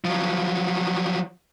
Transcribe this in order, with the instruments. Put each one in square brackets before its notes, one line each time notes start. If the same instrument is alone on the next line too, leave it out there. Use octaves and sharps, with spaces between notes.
[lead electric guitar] F3 F#3